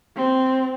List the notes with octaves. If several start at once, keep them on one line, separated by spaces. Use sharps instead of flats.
C4